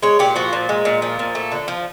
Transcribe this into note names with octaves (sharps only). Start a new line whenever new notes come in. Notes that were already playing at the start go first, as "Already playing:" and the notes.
G#3 C#5
A#2 G4
F3 F#4
A#2
G#3
A#2
F3
A#2
A3
D3
F3